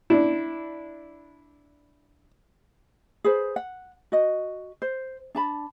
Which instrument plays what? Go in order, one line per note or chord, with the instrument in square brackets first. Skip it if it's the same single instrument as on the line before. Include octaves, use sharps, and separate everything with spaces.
[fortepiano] D4 E4
[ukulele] G#4 B4 C5
F#5
F#4 D#5
C5
D4 A5 B5